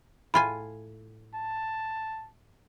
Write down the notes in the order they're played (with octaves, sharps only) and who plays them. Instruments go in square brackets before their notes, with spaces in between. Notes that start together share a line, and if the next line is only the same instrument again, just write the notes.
[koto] A2 F4 G#5 [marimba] B5
[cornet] A5